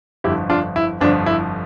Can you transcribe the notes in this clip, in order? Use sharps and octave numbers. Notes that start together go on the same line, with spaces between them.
G1 F2 D3 F3 E4 G4
D4 F4
E4
G1 F2 D3 F3 D4
E4